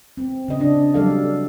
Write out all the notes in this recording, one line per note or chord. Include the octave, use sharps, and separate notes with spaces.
C4
C#3 D#5
D4
F#3 G3 D4 A4 D5 F5